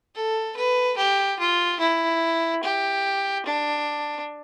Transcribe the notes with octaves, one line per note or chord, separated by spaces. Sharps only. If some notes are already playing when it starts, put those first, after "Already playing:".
A4
B4
G4
F4
E4
G4
D4